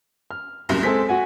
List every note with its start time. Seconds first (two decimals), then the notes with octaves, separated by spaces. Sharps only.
0.31 F6
0.69 F#1 C2 F#2
0.83 G#3 C4 A4 B6
1.09 F#4 F#5 G#5